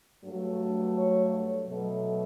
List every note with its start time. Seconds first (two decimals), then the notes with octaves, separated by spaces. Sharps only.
0.24 G2 F#3 A3
0.96 C#5
1.67 B2 F#3 A3